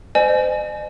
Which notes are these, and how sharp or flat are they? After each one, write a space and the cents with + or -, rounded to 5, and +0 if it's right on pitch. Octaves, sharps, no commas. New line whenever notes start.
C5 -30 D#5 -45 G#5 +25